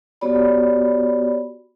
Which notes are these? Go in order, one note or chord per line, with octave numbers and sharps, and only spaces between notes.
B3 F#4 G4 C#5 D5 B5